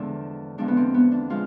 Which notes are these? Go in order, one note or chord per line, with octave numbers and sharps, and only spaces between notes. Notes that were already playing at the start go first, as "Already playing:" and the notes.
Already playing: E2 D3 F3 G#3 D4
E2 D3 F3 G#3 D4
B3
C4
B3
D4
F3 G#3 F4